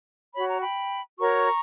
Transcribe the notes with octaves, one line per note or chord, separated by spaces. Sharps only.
F#4 C#5 B5
A#5
G5 B5
F#4 A#4 C#5 A#5 C#6